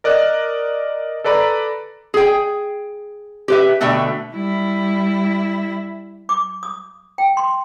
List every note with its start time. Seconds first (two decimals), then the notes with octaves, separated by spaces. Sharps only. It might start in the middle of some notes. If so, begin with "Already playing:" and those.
0.04 A#4 D5 D#5 F#6
1.24 A4 B4 D5 A#5 B5
2.14 G#4 G5
3.48 G4 B4 E5
3.81 B2 D3 A3 E5 G5
4.33 G3 E4
6.29 D6
6.63 D#6
7.18 G5
7.37 C6